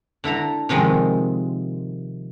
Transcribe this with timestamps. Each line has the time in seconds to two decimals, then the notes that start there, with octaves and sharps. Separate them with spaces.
0.24 D3 E4 A4 A#5
0.69 C3 D#3 F3 G#3